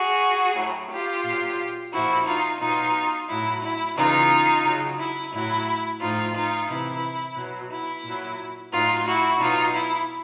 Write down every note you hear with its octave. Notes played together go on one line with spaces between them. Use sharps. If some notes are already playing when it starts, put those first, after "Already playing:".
Already playing: F#4 G#4
A2 F#3
F4 G4
A#2 F#3
A#2 F3 E4 F#4
D#4 F4
B2 F#3 D#4 F4
A2 F#3 E4
E4
C#3 E3 D#4 F4
C#3 F#3
E4
A2 F#3 E4
A2 F3 D#4 F4
D#4 F4
C3 E3 E4
B2 F#3
E4
A#2 F#3
A2 F#3 D#4 F4
E4 F#4
B2 F#3 D#4 F4
E4